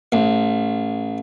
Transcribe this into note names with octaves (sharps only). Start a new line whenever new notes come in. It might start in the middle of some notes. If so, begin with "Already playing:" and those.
A1